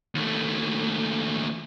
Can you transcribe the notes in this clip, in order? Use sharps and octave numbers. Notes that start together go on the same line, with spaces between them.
D#2 A3